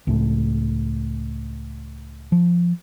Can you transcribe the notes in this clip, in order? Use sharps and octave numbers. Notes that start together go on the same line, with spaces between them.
C#2 A2
F3